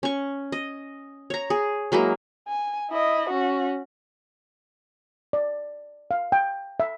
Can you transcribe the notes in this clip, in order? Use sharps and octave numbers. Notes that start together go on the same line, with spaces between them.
C#4 C#6
D#5
C#5 A#5
G#4
F#3 G#3 A#3 E4
G#5
E4 D#5
C#4 F#4
D5
F5
G5
E5